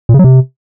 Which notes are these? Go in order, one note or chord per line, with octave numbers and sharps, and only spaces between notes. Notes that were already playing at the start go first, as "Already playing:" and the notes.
A#2
C#3
F#3
C3